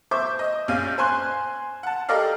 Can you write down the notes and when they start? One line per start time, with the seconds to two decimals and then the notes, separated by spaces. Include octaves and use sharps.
0.11 C5 E5 C#6 D6 G6
0.39 D#5
0.68 A#1 C#4 F5 G6 D#7
0.98 C5 G#5 C6 F#6
1.83 F#5 A5
2.09 G4 A4 A#4 D5 D#5 F5